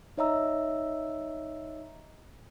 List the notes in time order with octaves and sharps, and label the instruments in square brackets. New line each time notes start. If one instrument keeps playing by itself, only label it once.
[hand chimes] D#4 C#5 D#5 E5 A#5 E6